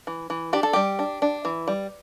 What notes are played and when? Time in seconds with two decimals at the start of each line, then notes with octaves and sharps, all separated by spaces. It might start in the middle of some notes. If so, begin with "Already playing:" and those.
0.07 E3
0.30 E3
0.53 D4 G4
0.63 A4
0.73 G3 G4
0.99 D4
1.22 D4
1.45 E3
1.68 G3